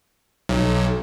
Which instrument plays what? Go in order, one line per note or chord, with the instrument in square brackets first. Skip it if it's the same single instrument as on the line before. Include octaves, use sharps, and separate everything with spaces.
[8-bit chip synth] B1